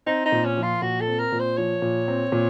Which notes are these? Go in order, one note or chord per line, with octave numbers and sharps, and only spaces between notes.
C4 D#4
D#4
A#2
C#4
F3
F4
A#2 F#4
A4
C4
A#4
A#2
C5
F3 C#5
A#2
C4
A#2